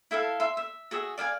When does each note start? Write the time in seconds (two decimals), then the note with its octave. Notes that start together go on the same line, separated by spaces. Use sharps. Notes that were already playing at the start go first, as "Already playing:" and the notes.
0.11 E4 A4 E5 F5
0.40 E5 C6
0.57 E5
0.91 F#4 G#4 E5
1.18 D5 F5 G5 G#5